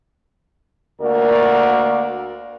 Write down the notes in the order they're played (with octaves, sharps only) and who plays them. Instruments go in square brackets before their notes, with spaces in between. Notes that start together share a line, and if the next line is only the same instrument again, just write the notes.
[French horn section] D2 A#3 F#4 A#4 D5